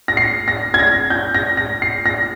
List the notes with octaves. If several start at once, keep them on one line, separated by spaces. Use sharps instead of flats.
A#6
C7
A#6
G#6
A#6
G6
A#6
A#6
C7
A#6